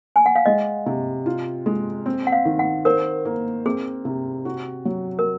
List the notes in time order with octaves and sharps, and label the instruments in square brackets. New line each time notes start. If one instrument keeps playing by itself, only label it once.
[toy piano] G#5
F#5
F5
[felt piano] G#3 [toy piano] D#5
[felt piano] C3
F4
G#3
C4
[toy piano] F#5
F5
[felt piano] D#3
[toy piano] F#5
[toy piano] A#4 [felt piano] C5
[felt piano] A#3
[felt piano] C4 [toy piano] G#4
[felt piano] C3
F#4
F#3
[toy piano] A#4